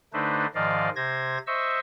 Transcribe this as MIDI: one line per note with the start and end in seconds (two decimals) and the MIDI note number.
0.13 0.46 50
0.13 0.46 57
0.13 0.46 62
0.13 0.46 63
0.13 0.46 71
0.13 0.46 72
0.55 0.89 44
0.55 0.89 51
0.55 0.89 53
0.55 0.89 74
0.55 0.89 75
0.55 0.89 77
0.96 1.38 48
0.96 1.38 72
0.96 1.38 92
0.96 1.38 94
1.47 1.80 72
1.47 1.80 75
1.47 1.80 76
1.47 1.80 85
1.47 1.80 88